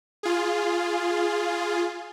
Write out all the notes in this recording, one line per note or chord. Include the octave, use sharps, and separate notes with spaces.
F4 G#4